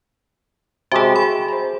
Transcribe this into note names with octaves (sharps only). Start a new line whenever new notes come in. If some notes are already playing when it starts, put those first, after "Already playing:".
C3 G#3 A3 F#4 G#4
G#4 B5
C5 A#5